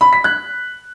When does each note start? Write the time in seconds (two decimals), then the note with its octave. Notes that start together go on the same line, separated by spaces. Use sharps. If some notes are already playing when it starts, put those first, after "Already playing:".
0.01 B5
0.13 B6
0.24 F#6